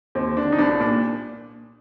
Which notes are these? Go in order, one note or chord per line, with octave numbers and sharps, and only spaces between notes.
D#2 C4
D3 D4
D#4
C2 D4
D4
A#2 D4